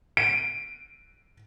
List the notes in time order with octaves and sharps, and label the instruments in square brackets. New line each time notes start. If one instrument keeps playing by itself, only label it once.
[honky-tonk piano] D7 D#7